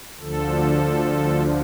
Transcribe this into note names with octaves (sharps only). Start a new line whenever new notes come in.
D2 D3 F3 A4